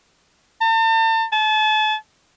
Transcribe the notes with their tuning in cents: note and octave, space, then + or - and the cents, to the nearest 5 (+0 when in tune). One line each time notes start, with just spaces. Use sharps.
A5 +40
A5 -35